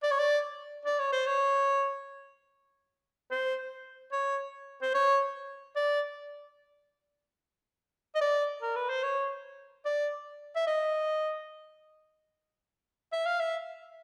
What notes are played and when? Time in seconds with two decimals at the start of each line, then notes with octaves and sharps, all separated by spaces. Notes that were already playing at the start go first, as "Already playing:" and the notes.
0.03 D5
0.11 C#5
0.19 D5
0.86 D5
0.99 C#5
1.12 C5
1.26 C#5
3.31 C5
4.12 C#5
4.82 C5
4.94 C#5
5.76 D5
8.15 D#5
8.21 D5
8.62 A#4
8.76 B4
8.89 C5
9.03 C#5
9.85 D5
10.56 E5
10.67 D#5
13.12 E5
13.26 F5
13.40 E5